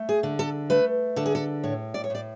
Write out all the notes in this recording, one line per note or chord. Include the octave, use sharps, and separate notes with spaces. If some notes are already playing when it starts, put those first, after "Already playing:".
Already playing: A3
G#4
D3
A4
A3 B4
D3 A4
G#4
A4
A2 C#5
D5
C#5
A2 D5